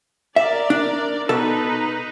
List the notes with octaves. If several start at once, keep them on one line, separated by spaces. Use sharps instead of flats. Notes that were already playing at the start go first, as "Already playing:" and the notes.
A#4 D5 E5
D4
B2 D#4 A4 B4